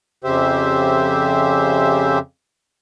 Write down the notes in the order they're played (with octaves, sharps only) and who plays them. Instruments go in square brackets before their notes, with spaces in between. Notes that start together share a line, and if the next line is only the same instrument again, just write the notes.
[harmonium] F2 C#3 G4 C5 E5